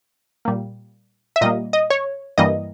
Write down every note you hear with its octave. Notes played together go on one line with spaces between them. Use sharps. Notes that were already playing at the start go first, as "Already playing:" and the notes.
A#2 G3 A#3
E5
A#2 G3 A#3 D#5
D#5
C#5
G2 E3 G3 A#3 D#5